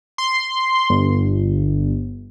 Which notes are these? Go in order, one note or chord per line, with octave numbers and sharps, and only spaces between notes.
C6
G1